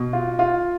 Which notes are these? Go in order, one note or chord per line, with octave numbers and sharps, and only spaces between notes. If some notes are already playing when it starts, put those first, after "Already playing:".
Already playing: B2
F4
F4